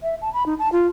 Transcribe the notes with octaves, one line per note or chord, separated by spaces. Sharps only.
E5
A5
B5
D#4
A5
F4